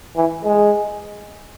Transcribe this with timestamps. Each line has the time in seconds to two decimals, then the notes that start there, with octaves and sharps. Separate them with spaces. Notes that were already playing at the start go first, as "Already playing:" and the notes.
0.16 E3
0.44 G#3